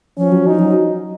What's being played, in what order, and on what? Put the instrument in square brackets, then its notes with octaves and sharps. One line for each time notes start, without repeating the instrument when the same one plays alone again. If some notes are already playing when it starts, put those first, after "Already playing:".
[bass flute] F3 [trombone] C#4
[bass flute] F#3
[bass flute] F3 [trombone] D#4
[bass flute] F#3